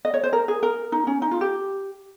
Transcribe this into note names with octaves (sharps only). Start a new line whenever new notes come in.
D#5
C#5
C5
A#4
G#4
A#4
D#4
C#4
D#4
F4
G4